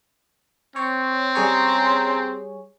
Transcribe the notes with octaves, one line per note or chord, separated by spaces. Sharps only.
C4 C#5
G3 C#4 G#4 C#5 A#5 C6